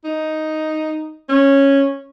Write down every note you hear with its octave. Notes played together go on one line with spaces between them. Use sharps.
D#4
C#4